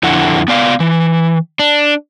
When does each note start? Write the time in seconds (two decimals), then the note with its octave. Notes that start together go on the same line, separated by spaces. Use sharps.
0.03 F2 D3 E4 F#5
0.48 B3 D5 F5
0.80 E3
1.59 D4